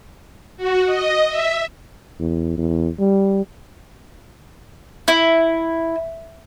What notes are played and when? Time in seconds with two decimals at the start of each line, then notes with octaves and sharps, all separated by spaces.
0.57 F#4
0.86 D#5
1.28 E5
2.19 E2
2.58 E2
2.99 G3
5.08 E4